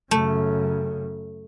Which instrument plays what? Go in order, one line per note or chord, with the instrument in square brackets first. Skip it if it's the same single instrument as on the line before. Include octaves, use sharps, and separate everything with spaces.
[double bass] F#2 C#3 [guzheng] A3